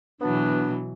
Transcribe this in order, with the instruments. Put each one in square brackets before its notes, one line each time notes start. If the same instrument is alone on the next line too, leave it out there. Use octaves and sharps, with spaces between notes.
[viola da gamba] B2 E3 F#3 [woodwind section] B3 D4